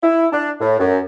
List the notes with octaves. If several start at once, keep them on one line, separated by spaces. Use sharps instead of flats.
E4
D4
A2
F#2